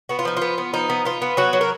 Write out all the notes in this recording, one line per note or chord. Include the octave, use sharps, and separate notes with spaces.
B3 F#4
F4
F3 D#4
B3 F4
B3
F3 D#4
B3
B3 F4
B3
F#3 F#4
F#3
A#4